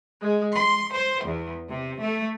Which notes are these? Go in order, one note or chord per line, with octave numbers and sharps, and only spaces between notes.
G#3
C6
C5
E2
C3
A3